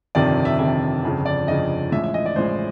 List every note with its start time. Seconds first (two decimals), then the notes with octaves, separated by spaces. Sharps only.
0.15 G1 F2 C3 D#3 D5
0.45 E5
0.59 G1 F2 C3 D#3 E5
1.03 G1 F2 C#3 F3
1.26 D5
1.48 G1 F2 C#3 F3 D#5
1.92 A1 A2 F3 G#3 E5
2.04 E5
2.14 D#5
2.26 D5
2.36 A1 A2 F3 G#3 C5